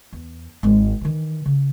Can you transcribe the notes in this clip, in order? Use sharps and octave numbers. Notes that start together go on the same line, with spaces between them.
E2
G#1 G#3
D#3 E3
C#3